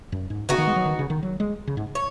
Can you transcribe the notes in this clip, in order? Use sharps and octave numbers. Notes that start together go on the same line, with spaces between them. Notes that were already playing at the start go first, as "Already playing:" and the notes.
F#2
G#2
C#3 B3 D#4 F#4
D#3
G#3
F#3
D#3
C#3
D#3
F#3
G#3
C#3
G#2
C#5